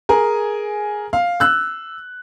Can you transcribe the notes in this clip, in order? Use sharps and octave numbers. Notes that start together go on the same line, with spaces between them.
G#4 A#4 G#5
F5
E6 F#6